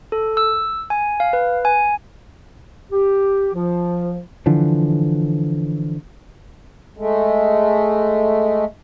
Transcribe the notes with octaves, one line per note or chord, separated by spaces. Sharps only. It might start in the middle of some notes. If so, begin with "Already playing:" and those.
A4
E6
G#5
F5
B4
G#5
G4
F3
D3 E3 F3
G#3 A3